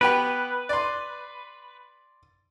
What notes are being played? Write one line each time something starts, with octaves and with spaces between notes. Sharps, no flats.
B3 G4 B4 G5
D5 C6